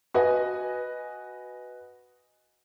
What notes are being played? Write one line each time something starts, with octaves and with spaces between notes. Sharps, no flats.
F#4 B4 D#5 G#5